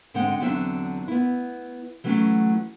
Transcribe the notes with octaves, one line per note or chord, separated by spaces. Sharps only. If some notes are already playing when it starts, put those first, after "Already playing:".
G#2 D3 G#3 C4 F#5 G5
E2 D3 F#3 C4 D4 E5
B3 E4
E3 F#3 A3 C#4 F#4